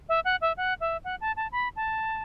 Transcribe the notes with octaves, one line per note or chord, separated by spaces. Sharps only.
E5
F#5
E5
F#5
E5
F#5
A5
A5
B5
A5